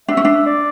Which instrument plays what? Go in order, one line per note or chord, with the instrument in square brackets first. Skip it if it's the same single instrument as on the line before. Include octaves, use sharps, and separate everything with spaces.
[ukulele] D4 [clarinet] E5
[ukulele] C#4
D4
[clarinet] D5